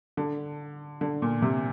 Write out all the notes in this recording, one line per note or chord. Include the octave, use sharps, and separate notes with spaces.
D3
D3
A#2
C3